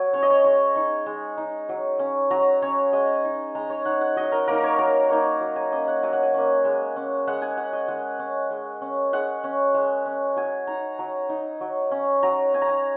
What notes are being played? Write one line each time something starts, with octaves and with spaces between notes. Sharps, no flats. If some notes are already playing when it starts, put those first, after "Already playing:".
Already playing: F#3 G#5
C#4 C#5
D#5
C#5
G#3 C#6
D#4 C#6
G#3
D#4
F#3
C#4
F#3 A#5
C#4 C#5
G#3 D#5
D#4
G#3 A#5
C#5
D#4 F#5
F#5
F#3 D#5
A#4
A#3 D#4 A#4
C#5
F#3 A#5
A#3 D#4 C#6
F#3
G#5
A#3 C#4 D#5
F#5
F#3 G#5
F#5
G#5
A#3 C#4
G#3
C#4
G#3 F#5
G#5
C#4 F#5
D#5
G#3 F#5
C#4
G#3
C#4
G#3 F#5
C#4
G#3
C#4
F#3 G#5
D#4 A#5
F#3 A#5
D#4
F#3
C#4
F#3 A#5
C#4 G#5
A#5
G#5